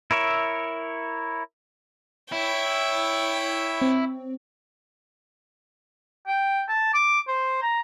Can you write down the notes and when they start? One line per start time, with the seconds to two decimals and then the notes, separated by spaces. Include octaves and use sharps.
0.11 E4 A#4 C#5 E5
2.32 E4 C#5 G5
3.82 C4
6.27 G5
6.69 A5
6.94 D6
7.28 C5
7.62 A#5